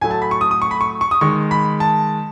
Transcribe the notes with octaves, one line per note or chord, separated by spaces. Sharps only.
A2 F#3 A3 G#5
A5
B5
C#6
D#6
D#6
C#6
B5
C#6
C#6
D#6
D#3 G#3 C#6
B5
A5